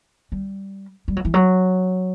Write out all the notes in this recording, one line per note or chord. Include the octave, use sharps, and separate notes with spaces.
G3
G3
F#3
E3
F#3